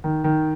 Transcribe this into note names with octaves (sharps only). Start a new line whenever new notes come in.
D#3
D#3